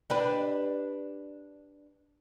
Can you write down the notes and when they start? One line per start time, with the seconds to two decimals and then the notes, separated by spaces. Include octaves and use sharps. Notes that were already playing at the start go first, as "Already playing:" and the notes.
0.10 D4 G4 B4